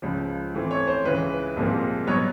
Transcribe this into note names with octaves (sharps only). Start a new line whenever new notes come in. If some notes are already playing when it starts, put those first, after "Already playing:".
C#2 C#3 F3
A2 E3 A3 C4
C#5
C5
C#2 C#3 E3 B4
C2 A#2 F3 G#3 C4
B2 F#3 B3 C#5